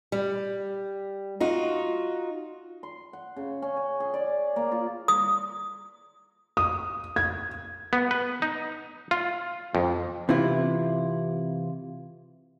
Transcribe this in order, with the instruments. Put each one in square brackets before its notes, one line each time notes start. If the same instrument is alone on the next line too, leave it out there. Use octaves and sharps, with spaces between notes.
[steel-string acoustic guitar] G3
D#4 F4 F#4
[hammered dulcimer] C6
F#5
C#3
C#4
G#5
G#4
D5
A#3
F4
[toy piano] D#6
[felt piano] D#6
G#6
[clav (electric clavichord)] B3
B4
D#4
F4
F2
[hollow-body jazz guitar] C3 E3 E4 F4